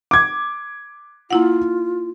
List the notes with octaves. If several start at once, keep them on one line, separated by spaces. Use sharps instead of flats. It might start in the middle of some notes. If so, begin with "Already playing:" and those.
D6 G#6
A#3 E4 F4 F#5